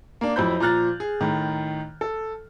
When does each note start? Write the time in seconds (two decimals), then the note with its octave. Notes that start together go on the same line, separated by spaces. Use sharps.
0.21 A#3 D4
0.36 F2 F#3 E4 C5 B5 G6
0.60 A#2 F3 A#5 F6 F#6 A6
1.00 G#4
1.21 A2 D#3
2.01 A4